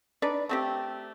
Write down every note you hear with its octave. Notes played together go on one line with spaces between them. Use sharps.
D4 D#4 B4 D5
A3 C4 G4